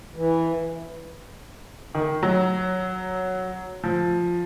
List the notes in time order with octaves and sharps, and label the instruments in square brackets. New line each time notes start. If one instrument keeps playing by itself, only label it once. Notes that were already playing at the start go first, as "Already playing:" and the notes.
[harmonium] E3
[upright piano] D#3
F#3
F3